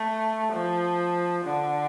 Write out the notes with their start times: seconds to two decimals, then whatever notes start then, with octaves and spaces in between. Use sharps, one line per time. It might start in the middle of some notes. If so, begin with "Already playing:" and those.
Already playing: A3
0.52 F3
1.45 D3